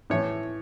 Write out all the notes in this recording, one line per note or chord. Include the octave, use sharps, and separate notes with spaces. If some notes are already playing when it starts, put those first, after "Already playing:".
A2 E3 C#5